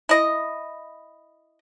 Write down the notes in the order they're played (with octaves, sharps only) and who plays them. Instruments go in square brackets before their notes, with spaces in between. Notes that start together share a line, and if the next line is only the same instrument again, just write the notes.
[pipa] E4 D#5